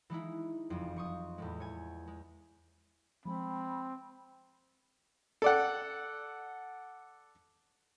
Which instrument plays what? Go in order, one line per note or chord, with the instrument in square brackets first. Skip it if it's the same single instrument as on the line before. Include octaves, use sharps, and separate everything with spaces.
[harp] E3 G#3 D#4 E4
F#1 F2
F3 C#6 D#6
E2 A2 G#3
C#5 G#5
G#3
[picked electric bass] F3 G#3 [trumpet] C4 [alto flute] B5
[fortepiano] A4 D5 F#5